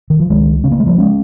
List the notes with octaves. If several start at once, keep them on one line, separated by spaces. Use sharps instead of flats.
D#3
F3
C#2 D#3 G#3
C#3 C#4
A#3
G#3
F3 A#3
G#3 C#4